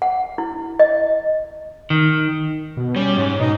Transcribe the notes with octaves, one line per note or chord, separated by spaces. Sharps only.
F#5
E4
D#5
D#3
B2
G3 C#4
G#2
B2 D#4